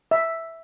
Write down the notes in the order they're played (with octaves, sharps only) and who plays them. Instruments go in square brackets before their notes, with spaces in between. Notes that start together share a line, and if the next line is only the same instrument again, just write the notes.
[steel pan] E5